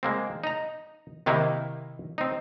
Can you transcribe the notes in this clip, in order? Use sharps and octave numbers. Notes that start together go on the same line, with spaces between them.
G#3 A#3 C4
D#4 A#5
C3 D#3 A#3 D#4 E4
C4 D#4